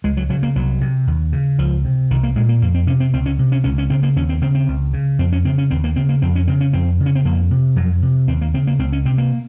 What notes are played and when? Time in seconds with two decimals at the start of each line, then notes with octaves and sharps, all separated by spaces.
0.04 C#2 G#3
0.17 F#3
0.29 C#3 F#3
0.43 A#3
0.56 C2 F#3
0.81 C3
1.07 D#2
1.33 C#3
1.58 C#2 F3
1.85 C3
2.11 C2 D#3
2.23 A#3
2.35 A#2 G#3
2.49 A#3
2.62 F2 A#3
2.75 C4
2.87 C3 C#4
3.00 C4
3.13 C#2 C4
3.26 C#4
3.39 C3
3.52 C#4
3.64 C#2 C#4
3.78 C#4
3.90 C#3 C4
4.03 A#3
4.16 D#2 C#4
4.29 C4
4.41 C#3 C4
4.55 C4
4.68 C#2
4.93 C#3
5.19 F2 C4
5.32 C#4
5.45 C#3 C4
5.58 C#4
5.71 D#2 C4
5.84 A#3
5.96 C#3 C4
6.09 A#3
6.22 F2 C4
6.35 C#4
6.48 C#3 C4
6.61 C#4
6.73 F2 C4
7.00 C#3
7.06 C#4
7.15 C4
7.25 F2 A#3
7.51 C3
7.76 F2 F#3
8.02 C3
8.28 D#2 C4
8.41 A#3
8.54 C#3 C4
8.67 A#3
8.79 C#2 C4
8.92 C#4
9.05 C3 C4
9.18 A#3